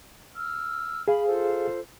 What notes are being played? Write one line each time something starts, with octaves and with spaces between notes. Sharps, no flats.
E6 F6
G#4 F5 B5
F4 A4 C5